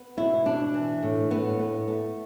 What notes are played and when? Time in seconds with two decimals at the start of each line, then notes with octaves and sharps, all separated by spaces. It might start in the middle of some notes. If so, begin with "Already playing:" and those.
Already playing: B3
0.17 B2 E4
0.45 B2 D4
0.74 E3
1.03 A2
1.30 A2 B3
1.59 B3
1.88 A3